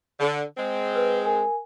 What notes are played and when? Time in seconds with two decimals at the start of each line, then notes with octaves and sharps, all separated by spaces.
0.20 D3
0.57 G#3 C4
0.96 B4
1.25 A#4 G#5